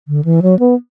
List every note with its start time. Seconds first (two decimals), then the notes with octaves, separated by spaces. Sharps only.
0.08 D3
0.25 E3
0.42 F#3
0.59 B3